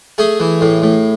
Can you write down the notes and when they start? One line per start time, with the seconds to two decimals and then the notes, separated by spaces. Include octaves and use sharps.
0.18 A3 G#4
0.40 E3
0.61 A2
0.82 A2